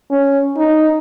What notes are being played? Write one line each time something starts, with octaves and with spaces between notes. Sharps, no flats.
C#4
D#4